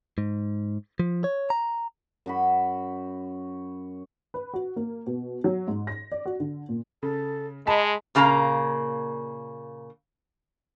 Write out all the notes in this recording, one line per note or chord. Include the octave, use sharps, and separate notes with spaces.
G#2
F3
C#5
A#5
F#2 F#4 B5
B4
F#4
A#3
B2
F#3
G#2
A#6
D5
F#4
D3
A#2
C#3 A4
G#3 D#5 A5 B5 B6
A#2 C#3 A#3 A#5